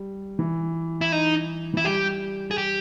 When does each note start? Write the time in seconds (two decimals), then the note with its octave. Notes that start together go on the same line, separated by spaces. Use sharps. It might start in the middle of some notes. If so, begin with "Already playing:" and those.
Already playing: G3
0.39 E3
1.01 E4
1.12 D#4
1.74 E3 E4
1.84 G3 G4
2.51 G#4
2.58 G4